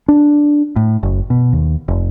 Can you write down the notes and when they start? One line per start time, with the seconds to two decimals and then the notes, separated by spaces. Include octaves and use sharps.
0.08 D4
0.76 A2
1.03 F#1
1.30 B2
1.53 D#2
1.88 F1